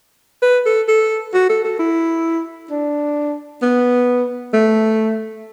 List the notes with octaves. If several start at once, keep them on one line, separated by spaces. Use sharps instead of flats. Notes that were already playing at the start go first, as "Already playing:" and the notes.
B4
A4
A4
F#4
A4
A4
E4
D4
B3
A3